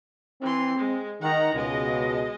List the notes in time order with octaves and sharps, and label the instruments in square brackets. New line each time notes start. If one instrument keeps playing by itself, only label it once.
[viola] E3 C6 [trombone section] C4
[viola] G#3
[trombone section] D#3 [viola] F#5 A#5
[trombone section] C#2 B2 [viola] G#3 D#5